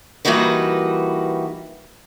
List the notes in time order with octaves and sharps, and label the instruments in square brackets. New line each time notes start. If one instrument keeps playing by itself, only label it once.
[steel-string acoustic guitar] E3 G3 A#3 D#4 F#4 B4